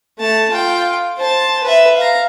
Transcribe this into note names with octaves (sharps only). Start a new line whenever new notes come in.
A3 A5
F4 G5
C5 A5
B4 E5
F5 A#5